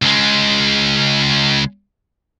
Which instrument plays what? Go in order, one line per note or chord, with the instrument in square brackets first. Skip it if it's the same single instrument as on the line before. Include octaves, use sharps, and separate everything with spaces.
[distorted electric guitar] C#2 G#3